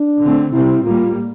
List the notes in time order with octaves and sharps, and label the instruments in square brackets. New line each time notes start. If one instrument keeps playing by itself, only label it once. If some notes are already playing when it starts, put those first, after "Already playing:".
Already playing: [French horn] D4
[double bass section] D3 A3 C4
[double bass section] C3 G3 C4 [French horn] E4
[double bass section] A2 G3 A#3 [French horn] F4